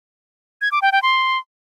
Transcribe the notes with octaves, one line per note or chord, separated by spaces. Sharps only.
G#6
D6
G5
G5
C6